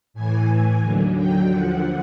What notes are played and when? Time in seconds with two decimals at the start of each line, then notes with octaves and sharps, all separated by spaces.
0.14 A2 E3 G#5
0.82 D#2 D3 F#3
1.16 G5
1.50 D#2 D3 F3 F#5